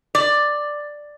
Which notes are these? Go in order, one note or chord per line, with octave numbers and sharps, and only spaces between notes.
D5